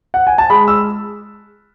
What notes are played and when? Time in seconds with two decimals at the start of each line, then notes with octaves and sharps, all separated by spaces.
0.14 F#5
0.27 G#5
0.38 A5
0.50 G#3 B5
0.68 E6